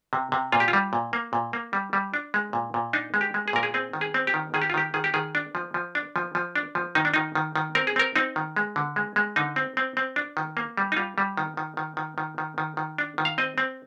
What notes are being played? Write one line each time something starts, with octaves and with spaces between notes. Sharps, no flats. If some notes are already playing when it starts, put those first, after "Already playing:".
C3
C3
A#2 F4
G4
F4
G3
A#2
A#3
A#2
A#3
G3
G3
D4
G#3
A#2
A#2
D4 D#4
G#3
G4
G#3
G#4
A#2 A#4
G#4
C4 G#4
D#3
G#4
C4
G4
D#3
D#3 G#4
G4
F4
D#3 G4
D#3 G#4
G4
D#3 G#4
D4
F3
F3
D4
F3
F3
D4
F3
D#3 D#4
D4
D#3 D#4
D#3
D#3
C4 A#4
G#4
C4 A#4
C4 D#4
D#3
G#3
D3
G#3
G#3
D3 D#4
C4
C4
C4
D4
D#3
A#3
G3
D#4
G3 F4
G3
D#3
D#3
D#3
D#3
D#3
D#3
D#3
D#3
D4
D#3
F5
C4 D#5
C4